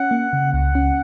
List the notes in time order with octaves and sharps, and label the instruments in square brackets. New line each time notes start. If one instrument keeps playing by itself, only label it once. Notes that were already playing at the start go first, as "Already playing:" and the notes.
Already playing: [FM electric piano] C#4 [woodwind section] F#5
[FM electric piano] A#3
C#3
[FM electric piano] C#2 [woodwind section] F#5
[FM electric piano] C#4